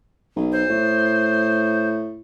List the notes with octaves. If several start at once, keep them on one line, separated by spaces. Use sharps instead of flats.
B1
C5
A2